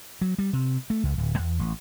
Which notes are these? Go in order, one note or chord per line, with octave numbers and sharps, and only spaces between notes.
F#3
G3
C3
A3
C#2
D1
E2
A1